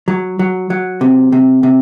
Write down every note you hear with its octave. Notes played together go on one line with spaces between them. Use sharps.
F#3
F#3
F#3
C3
C3
C3